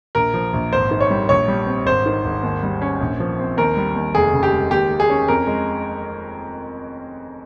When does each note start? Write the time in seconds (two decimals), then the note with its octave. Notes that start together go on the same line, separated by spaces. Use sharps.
0.15 A#1 A#4
0.34 F3
0.53 A#1
0.73 G#1 C5
0.91 D#3
1.01 C#5
1.10 G3
1.29 A#1 C#5
1.48 G3
1.67 C4
1.86 G#1 C5
2.06 D#3
2.25 G#1
2.43 D#2
2.63 G3
2.82 C#4
3.01 A#1
3.20 F3
3.39 C4
3.57 D#2 A#4
3.77 G3
3.96 D#2
4.15 F1 G#4
4.33 C#3
4.43 G4
4.53 G#3
4.71 D#2 G4
4.91 A#3
5.00 G#4
5.10 C#4
5.28 F2 A#4
5.47 G#3